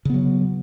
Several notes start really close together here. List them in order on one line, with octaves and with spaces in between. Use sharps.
C#3 B3 F#3